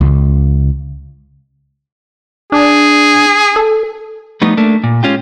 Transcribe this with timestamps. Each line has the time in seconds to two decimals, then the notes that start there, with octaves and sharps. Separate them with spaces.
0.01 C#2
2.52 D4 G#4
3.56 A4
4.41 F3 G3 A3 B3 D#4
4.57 A3 A#3 D4
4.84 A#2
5.03 G#3 C#4 F4 G4